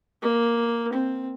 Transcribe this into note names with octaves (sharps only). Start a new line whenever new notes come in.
A#3
C4